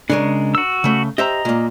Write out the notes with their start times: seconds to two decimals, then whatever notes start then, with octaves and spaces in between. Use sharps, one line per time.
0.10 C#3 G#3 D4 A#4 C#5
0.55 F#4 E6
0.84 C#3 A3
1.18 G4 C5 D#5 E5 A#5
1.45 A#2 A#3